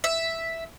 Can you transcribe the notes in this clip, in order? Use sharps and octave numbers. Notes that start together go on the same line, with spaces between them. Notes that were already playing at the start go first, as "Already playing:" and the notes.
E5